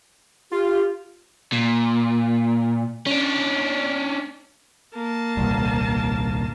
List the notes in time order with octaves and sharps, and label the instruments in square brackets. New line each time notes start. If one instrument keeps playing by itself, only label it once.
[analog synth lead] F4 [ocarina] G4
[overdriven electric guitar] A#2
C#4 D4
[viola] A#3 A5
[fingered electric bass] D#1 C2 G2